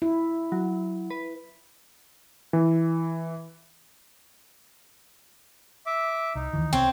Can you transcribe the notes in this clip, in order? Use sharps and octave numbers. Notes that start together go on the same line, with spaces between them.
E4
F#3
B4
E3
E5 D6
C2 D#4
D2 D#3 E3
C2 C4 C#5